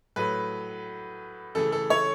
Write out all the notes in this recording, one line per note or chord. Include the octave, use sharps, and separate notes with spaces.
A2 F#3 A3 B4
C#3 E3 A3 A4
A4
C#5